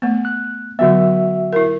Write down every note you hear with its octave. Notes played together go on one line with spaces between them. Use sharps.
A3 B3
F#6
D3 F#3 B3 F#4 E5
E4 A#4